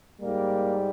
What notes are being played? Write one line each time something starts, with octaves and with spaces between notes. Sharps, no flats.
G#2 G3 A#3